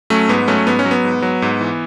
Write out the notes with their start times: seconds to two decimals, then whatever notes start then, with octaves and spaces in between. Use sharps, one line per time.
0.10 F#3 A3 C#4
0.29 G#2 B3
0.48 F#3 A3 C#4
0.67 G#2 B3
0.79 C#4
0.85 F#3
0.91 B3
1.04 G#2
1.22 F#3
1.42 G#2
1.61 E3